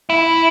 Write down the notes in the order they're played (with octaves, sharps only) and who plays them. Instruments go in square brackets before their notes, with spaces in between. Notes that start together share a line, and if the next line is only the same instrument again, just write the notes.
[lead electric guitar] E4